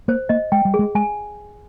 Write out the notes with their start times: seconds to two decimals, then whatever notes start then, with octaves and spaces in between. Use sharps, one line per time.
0.08 A#3 C5
0.29 A#3 D#5
0.52 G#3 G5
0.65 G3
0.74 G#4
0.79 G#3
0.95 G#3 G#5